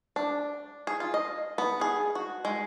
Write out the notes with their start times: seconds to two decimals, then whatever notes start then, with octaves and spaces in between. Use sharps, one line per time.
0.16 D4
0.87 G#4
1.00 F4
1.14 D#5
1.58 B3
1.81 G#4
2.15 F#4
2.45 G#3